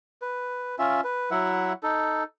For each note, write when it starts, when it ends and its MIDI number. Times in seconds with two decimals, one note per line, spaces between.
0.22 0.76 71
0.79 1.01 61
0.79 1.01 65
0.79 1.01 76
1.04 1.30 71
1.31 1.73 54
1.31 1.73 64
1.31 1.73 76
1.31 1.73 78
1.83 2.24 63
1.83 2.24 69